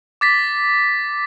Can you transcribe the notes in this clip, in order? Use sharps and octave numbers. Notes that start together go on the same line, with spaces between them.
D6 A6 B6